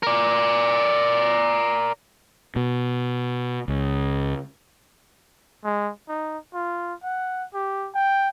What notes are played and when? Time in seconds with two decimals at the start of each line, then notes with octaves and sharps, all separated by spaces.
0.03 A#4 D5
2.56 B2
3.68 C#2
5.64 G#3
6.09 D#4
6.54 F4
7.03 F#5
7.54 G4
7.94 G5